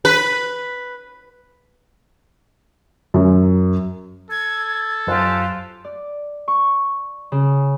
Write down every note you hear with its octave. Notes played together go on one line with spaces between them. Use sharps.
B4
F#2
A4 G#6
F#2 F4 G4 C5 G#5 A5 F#6
D5
C#6
C#3